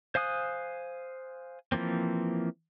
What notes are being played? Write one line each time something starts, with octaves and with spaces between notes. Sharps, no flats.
C5 F5 G#5 D#6 F#6
E3 F3 A#3 C4